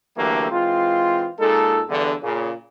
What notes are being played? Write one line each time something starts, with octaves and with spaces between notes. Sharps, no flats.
D3 E3 F#3 A3 A#3 G4
E3 G#3 C4 F4
A#2 G#3 D#4 A4
E2 G2 D3
A#2 C#3